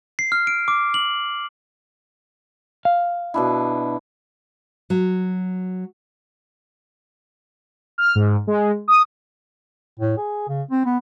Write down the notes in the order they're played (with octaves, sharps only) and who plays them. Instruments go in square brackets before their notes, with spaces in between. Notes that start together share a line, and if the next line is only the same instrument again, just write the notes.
[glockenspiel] C7
F6
D7
D6
F#7
[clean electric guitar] F5
[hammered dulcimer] B2 D4 E4
[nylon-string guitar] F#3
[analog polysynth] F6
G#2
G#3
D#6
[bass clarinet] A2
G#4
C#3
C4
B3